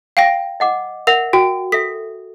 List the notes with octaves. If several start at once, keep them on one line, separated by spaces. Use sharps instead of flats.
F5 G5 A#6
D#5 F#5 D6
A#4 E5 F#5 F7
F#4 G5
A4 E5 B6